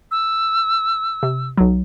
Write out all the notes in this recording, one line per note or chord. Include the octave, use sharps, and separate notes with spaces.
E6
C3
B1 F#3